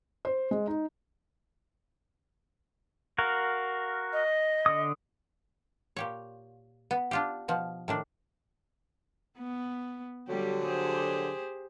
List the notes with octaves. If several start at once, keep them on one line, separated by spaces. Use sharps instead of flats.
C5
G#3
D#4
F#4 A#4 F5
D#5
D3 D#6
A#2 G4 C#5
B3
D4 F4 G4
B2 F3
A2 D#3 D4
B3
D3 F#3 G3 G4
G4 G#4 C5